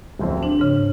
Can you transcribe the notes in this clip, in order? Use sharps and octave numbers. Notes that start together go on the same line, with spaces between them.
D1 F2 C4
D4 F#7
G#2 C#3